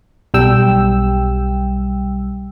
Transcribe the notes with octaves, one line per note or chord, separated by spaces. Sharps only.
B1 G3 G5 E6